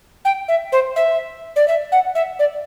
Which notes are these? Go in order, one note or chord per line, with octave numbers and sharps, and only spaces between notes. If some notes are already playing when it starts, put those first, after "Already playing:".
G5
E5
C5
E5
D5
E5
F#5
E5
D5